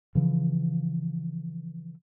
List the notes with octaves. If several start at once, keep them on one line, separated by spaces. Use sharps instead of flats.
C#3 E3 F3